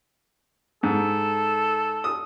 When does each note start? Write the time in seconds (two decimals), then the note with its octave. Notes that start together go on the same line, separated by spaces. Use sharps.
0.83 G#2 A4
2.04 D#6